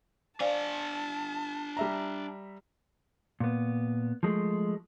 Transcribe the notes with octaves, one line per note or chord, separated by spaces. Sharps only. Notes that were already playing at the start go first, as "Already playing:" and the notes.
D4 C5 D5 F5 G#5 A5
G3 E5 A#5
A#2 B3
F3 G#3 A3